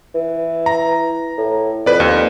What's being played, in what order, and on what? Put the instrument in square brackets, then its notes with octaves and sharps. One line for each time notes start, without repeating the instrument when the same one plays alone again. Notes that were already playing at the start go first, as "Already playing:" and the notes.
[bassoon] E3
[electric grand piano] A#5
[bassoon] A2
[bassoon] F2 [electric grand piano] B4 D5
[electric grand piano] D#2